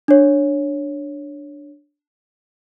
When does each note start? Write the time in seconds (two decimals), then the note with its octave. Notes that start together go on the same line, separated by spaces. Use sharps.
0.08 D4 C#5